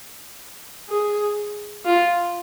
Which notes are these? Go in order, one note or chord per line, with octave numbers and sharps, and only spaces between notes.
G#4
F4